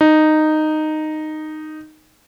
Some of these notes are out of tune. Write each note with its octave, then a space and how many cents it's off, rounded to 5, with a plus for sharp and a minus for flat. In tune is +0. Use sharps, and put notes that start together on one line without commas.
D#4 -10